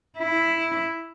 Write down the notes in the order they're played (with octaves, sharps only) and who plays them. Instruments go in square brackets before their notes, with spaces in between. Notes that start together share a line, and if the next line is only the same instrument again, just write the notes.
[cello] E4